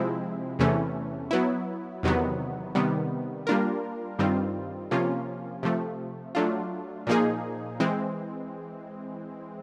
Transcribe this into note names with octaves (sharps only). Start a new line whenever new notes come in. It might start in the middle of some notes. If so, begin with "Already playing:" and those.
Already playing: C3 F3 G#3 C4 E4
E2 C3 E3 A3 C#4
F#3 B3 E4
E2 C3 D#3 F#3 B3
C3 D#3 G3 B3
G3 A#3 D4 F4 A#4
G2 D#3 G3 C4 F4
C3 F3 A#3 C#4 F4
C3 F3 A3
F#3 A3 D4 F4
A#2 F3 A#3 D#4 G#4
E3 G#3 C4